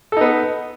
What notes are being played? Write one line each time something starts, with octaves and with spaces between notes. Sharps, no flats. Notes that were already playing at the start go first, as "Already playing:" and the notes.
B3 D#4 A4